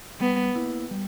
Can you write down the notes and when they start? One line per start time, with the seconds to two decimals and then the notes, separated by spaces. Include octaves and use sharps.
0.20 G3 B3
0.55 A#3 E4
0.91 G3